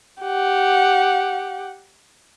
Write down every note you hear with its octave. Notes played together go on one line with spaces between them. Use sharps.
G4 F#5